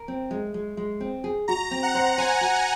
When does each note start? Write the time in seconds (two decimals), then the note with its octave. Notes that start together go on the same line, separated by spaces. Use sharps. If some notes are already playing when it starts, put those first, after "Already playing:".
Already playing: A#4
0.08 C4
0.31 G#3
0.54 G#3
0.77 G#3
1.00 C4
1.24 G#4
1.48 F#4 A#5
1.71 C4
1.83 F#5
1.95 C5
2.18 C5 G#5
2.41 F#4